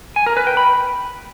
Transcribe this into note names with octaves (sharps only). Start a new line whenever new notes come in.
G#5
A#4
B4
G5
B5